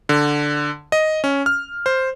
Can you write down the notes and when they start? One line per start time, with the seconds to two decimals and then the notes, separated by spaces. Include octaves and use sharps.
0.09 D3
0.92 D#5
1.24 C#4
1.46 F6
1.86 C5